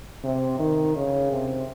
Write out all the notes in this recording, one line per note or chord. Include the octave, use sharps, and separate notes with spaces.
C3
D#3
C#3
C3